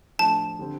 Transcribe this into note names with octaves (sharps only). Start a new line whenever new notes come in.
A2 F3 A3 D4 A5
D3 G3 C4